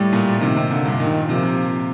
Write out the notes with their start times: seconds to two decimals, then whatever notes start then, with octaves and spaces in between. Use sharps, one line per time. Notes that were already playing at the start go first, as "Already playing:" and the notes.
Already playing: A2 G3
0.12 A#2
0.41 C3 D#3
0.56 C3
0.70 A#2 D3
0.85 G2
1.00 A#2 D#3
1.29 C3 F3
1.43 C3